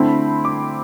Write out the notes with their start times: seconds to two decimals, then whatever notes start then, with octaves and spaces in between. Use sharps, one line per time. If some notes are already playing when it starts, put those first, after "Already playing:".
Already playing: D3 A3 C4 E4 B5
0.45 D6